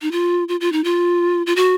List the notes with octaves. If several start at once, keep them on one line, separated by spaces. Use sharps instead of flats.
D#4
F4
F4
F4
D#4
F4
F4
F#4